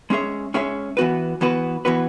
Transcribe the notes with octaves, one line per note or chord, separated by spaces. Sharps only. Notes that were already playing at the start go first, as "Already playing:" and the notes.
G#3 C#4 G#4 C#5 E5
G#3 C#4 G#4 C#5 E5
E3 B3 F#4 B4
E3 B3 F#4 B4
E3 B3 F#4 B4